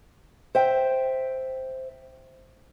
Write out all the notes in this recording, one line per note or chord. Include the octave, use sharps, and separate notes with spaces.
C5 E5 G5